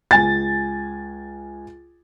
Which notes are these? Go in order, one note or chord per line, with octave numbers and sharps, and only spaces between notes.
C#2 G#5 A6